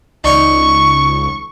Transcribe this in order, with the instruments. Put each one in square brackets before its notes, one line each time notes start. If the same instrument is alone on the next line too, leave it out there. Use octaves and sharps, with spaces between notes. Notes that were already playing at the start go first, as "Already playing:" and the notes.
[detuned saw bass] C#2 [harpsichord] D#4 D5 F5 [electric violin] C#6